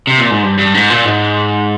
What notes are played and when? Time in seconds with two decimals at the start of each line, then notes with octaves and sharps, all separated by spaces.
0.07 C3
0.18 A#2
0.31 G#2
0.43 G2
0.58 G2
0.74 G#2
0.90 A#2
1.05 G#2